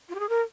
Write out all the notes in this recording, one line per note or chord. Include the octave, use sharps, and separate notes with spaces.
F4
G4
G#4
A#4